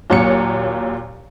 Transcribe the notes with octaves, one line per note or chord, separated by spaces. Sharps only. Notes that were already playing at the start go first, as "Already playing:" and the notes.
D#2 A#2 F#3 C#5 C#7